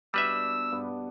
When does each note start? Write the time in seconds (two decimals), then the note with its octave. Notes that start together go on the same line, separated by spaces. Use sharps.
0.14 B2 G3 D4 B4 E5 D6 E6
0.72 G2 B3